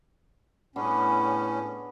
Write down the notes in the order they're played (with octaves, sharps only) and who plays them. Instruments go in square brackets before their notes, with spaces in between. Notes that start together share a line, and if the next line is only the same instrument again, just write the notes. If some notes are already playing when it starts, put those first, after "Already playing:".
[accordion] A2 C#4 [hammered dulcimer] B3 D4 G#4